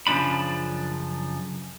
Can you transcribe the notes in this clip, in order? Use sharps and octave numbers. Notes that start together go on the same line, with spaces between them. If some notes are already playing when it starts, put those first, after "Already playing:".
F#2 C#3 F3 D4 B5